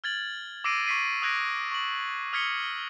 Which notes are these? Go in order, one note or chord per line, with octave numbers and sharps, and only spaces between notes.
F6 G#6 A6 F#7
D6 E6 A#6 C7 D7 D#7
C#6 D6 B6 C7 D#7
D#6 E6 F#6 G#6 A#6 D7
C#6 F#7
D#6 F6 G#6 B6 C#7 G7